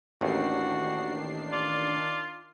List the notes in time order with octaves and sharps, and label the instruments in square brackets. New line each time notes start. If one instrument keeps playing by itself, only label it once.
[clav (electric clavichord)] A1 D#2 [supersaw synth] D#3 D4 C7 [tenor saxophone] F#4
[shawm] F4 [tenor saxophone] D5